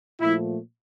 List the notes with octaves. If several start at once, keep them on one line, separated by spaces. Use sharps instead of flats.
A#2 F3 A3 E4